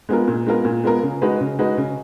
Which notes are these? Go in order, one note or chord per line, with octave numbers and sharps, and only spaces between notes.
G#3 B3 F4 A#4
A#2
G#3 B3 F4 A#4
A#2
G#3 B3 F4 A#4
C#3
G#3 D#4 F#4 B4
C#3
G#3 D#4 F#4 B4
C#3